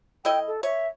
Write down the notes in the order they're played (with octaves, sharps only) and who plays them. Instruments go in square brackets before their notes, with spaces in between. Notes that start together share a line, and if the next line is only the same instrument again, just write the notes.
[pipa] A3 E4 D#5 [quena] G5
[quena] A4
[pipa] C#5 [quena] E5